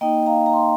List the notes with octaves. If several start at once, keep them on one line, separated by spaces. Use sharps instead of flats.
A#3 D#4 D#5 G5
F5 A#5
A#5
G5 C6